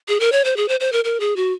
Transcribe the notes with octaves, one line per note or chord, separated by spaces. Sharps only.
G#4
A#4
C#5
C5
G#4
C5
C5
A#4
A#4
G#4
F#4